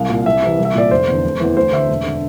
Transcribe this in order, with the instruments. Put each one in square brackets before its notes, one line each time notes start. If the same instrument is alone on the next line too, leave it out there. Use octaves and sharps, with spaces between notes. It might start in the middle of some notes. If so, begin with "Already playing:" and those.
Already playing: [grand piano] C2 F5
A#2
C2 E5
C3 E3
C2
E5
A#2 D5
F1 C5
E2 D3
F1
E2 E3
D2 C5
D3 E5
E1
D3